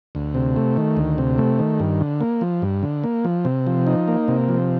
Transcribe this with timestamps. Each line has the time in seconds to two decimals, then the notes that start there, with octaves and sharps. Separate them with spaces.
0.15 D2
0.34 C3
0.56 A3
0.77 D#3
0.97 D2
1.18 C3
1.38 A3
1.59 D#3
1.80 G2
2.01 D3
2.21 A#3
2.41 F3
2.62 G2
2.83 D3
3.04 A#3
3.25 F3
3.45 C3
3.67 F3
3.87 D#4
4.08 A#3
4.28 C3
4.49 F3